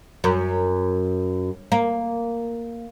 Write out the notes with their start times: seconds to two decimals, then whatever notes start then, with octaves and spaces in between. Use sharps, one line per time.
0.24 F#2
1.72 A#3